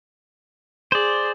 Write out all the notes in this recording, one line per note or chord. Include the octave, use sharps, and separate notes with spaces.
G#4 C5 D5